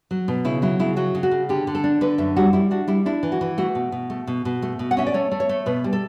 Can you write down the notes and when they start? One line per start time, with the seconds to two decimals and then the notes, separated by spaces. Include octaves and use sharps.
0.11 F#3
0.28 B2
0.45 C#3 E4
0.62 F#3 E4
0.79 C#3 E4
0.96 F#3 F#4
1.15 C#3
1.23 F#4
1.31 C#3
1.49 D3 G4
1.67 D3
1.75 A4
1.84 D4
2.01 D3 B4
2.18 F#2 E5
2.36 G3 F#4
2.53 G3 E4
2.71 D4 F#4
2.88 G3 E4
3.06 D4 E4
3.23 E3
3.32 F#4
3.41 E3
3.58 A3 F#4
3.75 B2
3.92 B2
4.10 A3
4.27 B2
4.45 B2
4.62 A3
4.79 B2
4.91 F#5
4.97 C#4 E5
5.07 D5
5.14 A3 C#5
5.31 A3
5.40 C#5
5.49 A3
5.66 B2 B4
5.84 G3
5.93 A4